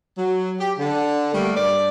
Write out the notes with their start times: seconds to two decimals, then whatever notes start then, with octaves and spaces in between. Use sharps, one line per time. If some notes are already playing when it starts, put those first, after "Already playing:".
0.18 F#3
0.60 G4
0.79 D3
1.34 G3 A3 A#3
1.56 G2 D5